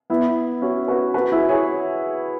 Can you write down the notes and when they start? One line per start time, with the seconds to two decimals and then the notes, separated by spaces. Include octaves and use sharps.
0.10 B3 E4
0.62 C#4 F#4
0.88 F#4 B4
1.14 F#4 B4
1.31 E4 G#4
1.49 G#4 C#5